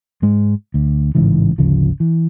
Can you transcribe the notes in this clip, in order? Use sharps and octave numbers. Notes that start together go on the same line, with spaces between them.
G#2 G#3
D2
A1 G#2 C#3 E3
G#1 D2 C#3 F3
E3